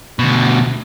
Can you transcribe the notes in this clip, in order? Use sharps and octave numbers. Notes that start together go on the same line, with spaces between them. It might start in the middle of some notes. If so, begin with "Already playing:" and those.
D2 B2